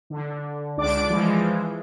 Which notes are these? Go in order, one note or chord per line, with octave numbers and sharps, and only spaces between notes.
D3
C#2 D4 D5 D6
E3 F3 G#3